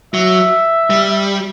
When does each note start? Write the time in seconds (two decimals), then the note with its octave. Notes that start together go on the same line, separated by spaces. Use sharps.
0.14 F#3 E5
0.90 G3